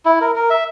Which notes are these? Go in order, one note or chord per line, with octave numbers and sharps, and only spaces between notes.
E4
A#4
A#4
E5